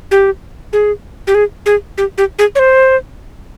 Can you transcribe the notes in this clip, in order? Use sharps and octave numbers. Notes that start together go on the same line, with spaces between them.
G4
G#4
G4
G#4
G#4
G4
G4
G#4
C#5
C5